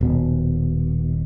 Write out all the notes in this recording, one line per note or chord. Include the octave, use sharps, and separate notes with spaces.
D#1 B2